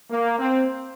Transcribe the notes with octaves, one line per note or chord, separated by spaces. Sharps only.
A#3
C4